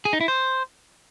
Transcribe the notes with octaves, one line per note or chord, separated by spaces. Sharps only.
G#4
D#4
E4
C5